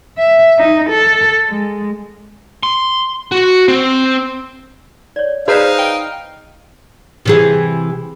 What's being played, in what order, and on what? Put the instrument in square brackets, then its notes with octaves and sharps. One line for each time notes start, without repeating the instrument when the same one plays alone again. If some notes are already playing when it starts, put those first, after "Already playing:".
[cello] E5
D#4
A4
G#3
[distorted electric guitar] C6
F#4
C4
[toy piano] C#5 D5
[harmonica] D#4 F5 [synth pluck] G#4 B4 C5 [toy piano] D5 A#5 B5
[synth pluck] G5
[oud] C3 E3 G#4